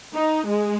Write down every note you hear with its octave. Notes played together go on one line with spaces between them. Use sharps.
D#4
G#3